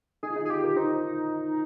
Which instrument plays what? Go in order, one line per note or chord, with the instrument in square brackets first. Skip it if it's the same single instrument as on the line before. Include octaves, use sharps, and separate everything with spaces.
[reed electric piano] D#4 [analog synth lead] G#4
[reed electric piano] F4
D#4
[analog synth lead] G#4
[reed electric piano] F4 [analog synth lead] G4
[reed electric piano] A#4
[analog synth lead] D#4 [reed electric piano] C5